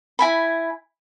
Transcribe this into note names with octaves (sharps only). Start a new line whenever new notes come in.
E4 G#5 B5